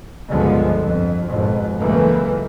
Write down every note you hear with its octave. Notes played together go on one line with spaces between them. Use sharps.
C#2 G2 D3 F3 G#3 B3
F2
G1 F2 G#2 B2
C#2 F#2 C#3 E3 A3 A#3